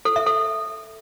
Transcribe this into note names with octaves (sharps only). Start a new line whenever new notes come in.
A4
E5
A4